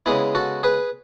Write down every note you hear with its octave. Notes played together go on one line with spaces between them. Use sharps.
C#3 G#3 B3 E4 G#4
F#4 A4
G#4 B4